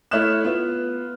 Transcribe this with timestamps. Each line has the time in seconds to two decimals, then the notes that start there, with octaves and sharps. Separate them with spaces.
0.11 A3 E4 C#5 F6 F#6 E7
0.45 B3 F4